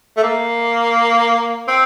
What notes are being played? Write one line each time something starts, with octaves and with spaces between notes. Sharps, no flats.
A3
A#3
C4